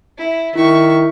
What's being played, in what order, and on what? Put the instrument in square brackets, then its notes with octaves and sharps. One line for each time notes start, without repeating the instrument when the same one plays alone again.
[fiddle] E4
[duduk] D#3 [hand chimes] E4 [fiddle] E5 C#6